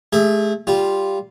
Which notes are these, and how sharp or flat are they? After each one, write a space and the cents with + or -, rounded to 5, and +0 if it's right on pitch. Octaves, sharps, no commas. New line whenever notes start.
A3 -45 G#4 -40 E5 +0
G3 +0 F4 -5